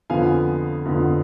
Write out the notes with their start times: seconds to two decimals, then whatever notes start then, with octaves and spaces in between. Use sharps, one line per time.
0.10 F2 D3 F3 B3 F5 G#5
0.85 F2 D3 F3 B3